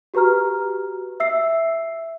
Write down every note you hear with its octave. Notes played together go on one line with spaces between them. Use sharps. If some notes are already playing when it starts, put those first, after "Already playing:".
F#4 G4 B4 A#5 F6
E5 E6 C7